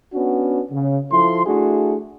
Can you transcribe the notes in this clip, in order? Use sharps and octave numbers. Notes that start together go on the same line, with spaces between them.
B3 C#4 D4 F#4
C#3
F3 E4 A4 C6
A3 D4 E4 F#4 G#4